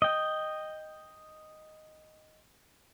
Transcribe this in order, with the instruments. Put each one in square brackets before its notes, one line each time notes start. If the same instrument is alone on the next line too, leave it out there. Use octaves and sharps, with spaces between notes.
[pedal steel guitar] D#5 G5